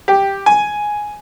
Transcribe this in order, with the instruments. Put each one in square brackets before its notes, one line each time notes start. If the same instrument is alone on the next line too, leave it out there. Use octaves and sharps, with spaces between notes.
[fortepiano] G4
G#5